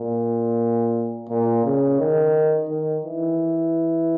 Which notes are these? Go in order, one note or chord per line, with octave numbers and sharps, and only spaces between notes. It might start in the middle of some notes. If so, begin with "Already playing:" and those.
Already playing: A#2
A#2
C#3
D#3
D#3
E3